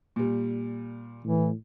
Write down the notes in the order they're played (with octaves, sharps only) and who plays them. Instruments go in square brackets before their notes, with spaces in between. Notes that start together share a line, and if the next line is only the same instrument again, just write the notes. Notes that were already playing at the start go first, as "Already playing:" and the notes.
[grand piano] A#2 G3
[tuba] A2 [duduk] E3